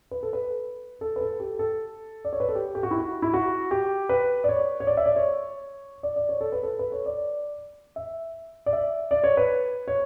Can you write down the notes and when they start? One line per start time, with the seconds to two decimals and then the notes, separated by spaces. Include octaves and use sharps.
0.11 B4
0.23 A4
0.33 B4
1.01 A4
1.16 B4
1.21 A4
1.40 G4
1.59 A4
2.25 D5
2.33 C#5
2.40 B4
2.49 A4
2.55 G4
2.75 G4
2.83 F#4
2.91 E4
2.98 F#4
3.22 E4
3.34 F#4
3.71 G4
4.09 B4
4.44 D5
4.49 C#5
4.80 C#5
4.87 D5
4.97 E5
5.06 D5
5.16 C#5
6.03 D5
6.16 D5
6.29 C#5
6.41 A4
6.52 B4
6.63 A4
6.79 B4
6.92 C#5
7.06 D5
7.96 E5
8.66 D5
8.73 E5
9.11 D5
9.24 C#5
9.37 B4
9.88 C#5